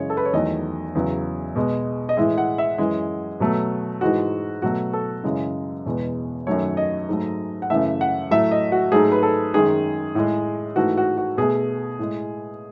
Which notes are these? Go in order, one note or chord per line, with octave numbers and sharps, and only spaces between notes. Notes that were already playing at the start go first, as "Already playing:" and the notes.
Already playing: F#2 C#3 E3 G#3 C#5
A4
B4
C#5
E2 D#3 F#3 A3 D#5
E2 C#3 F#3
B2 G#3
D#5
A2 E3 G#3 E5
F#5
E5
F#2 E3 G#3
B2 F#3 A3
G#2 E3 G#3 F#4
B2 F#3 A3 F#4
A4
F#2 C#3 E3 G#3
E2 B2 G#3
F#2 D#3 F#3 A3 C#5
D#5
G#2 F#3 A3
F#5
F#2 C#3 E3 A3 E5
F#5
A2 F#3 A3 E5
D#5
F#4
G#2 F#3 A3 G#4
B4
A4
F#2 D#3 G#3 G#4
A2 G#3
G#2 E3 A3 F#4
F#4
F#4
B2 A3 G#4
A2 G#3